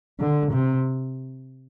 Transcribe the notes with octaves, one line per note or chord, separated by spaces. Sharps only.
D3
C3